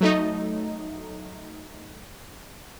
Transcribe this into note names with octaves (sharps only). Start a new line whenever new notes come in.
F#3 A3 D#4